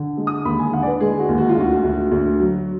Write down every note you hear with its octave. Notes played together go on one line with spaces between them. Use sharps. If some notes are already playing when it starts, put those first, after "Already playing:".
Already playing: D3
G#3
D#6
D#2 B5
G#5
D3 F#5
D5
B4
G#3 G#4
F#4
D#2
F#4
F4
D2 F#4
D2
D2
F#3